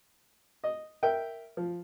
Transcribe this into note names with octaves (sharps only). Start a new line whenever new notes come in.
D#5
A#4 E5 G5
F3